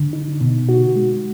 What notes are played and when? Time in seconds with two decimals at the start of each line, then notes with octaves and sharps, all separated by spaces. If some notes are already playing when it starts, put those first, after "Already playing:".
Already playing: D3
0.13 D#4
0.41 B2
0.69 F#4
0.96 G#3